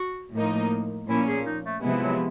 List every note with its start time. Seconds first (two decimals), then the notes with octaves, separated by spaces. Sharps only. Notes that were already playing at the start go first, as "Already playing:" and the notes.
Already playing: F#4
0.33 A2 F3 A#3 D#4
1.08 A#2 F3 A#3 C#4 E4
1.27 G#4
1.46 D#4
1.65 A3
1.82 C3 F3 G#3 B3 E4
2.02 F#3